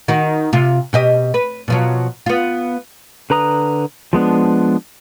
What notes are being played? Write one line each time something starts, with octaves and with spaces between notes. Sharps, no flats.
D#3 D#4 F#4
C3 F4
B2 G4 D#5
B4
B2 F3 F#3
B3 F4
D3 B4 A#5 D#6
F3 G#3 B3 D4